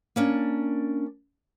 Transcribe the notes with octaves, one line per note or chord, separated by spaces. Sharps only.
A#3 C#4 D4